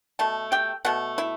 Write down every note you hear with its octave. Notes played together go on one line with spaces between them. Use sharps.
B2 A3 A5
G4 G5
B2 A3 F#5
E4 E5